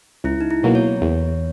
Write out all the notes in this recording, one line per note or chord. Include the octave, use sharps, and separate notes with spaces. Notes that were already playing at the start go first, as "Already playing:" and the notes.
C#2 E4
D#4
E4
B2 F#3 A#3
C#5
E2